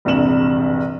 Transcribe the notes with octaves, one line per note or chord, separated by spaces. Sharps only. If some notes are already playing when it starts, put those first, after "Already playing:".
E1 A#1 G2 C3 E7 F#7